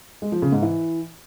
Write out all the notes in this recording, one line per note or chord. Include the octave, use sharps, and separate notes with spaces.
G#3
F3
C#3
G#2
E3